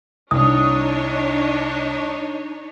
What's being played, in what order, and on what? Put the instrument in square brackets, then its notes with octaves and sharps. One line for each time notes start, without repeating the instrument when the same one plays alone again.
[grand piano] C2 [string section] D4 D#4 C#5 [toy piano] D#6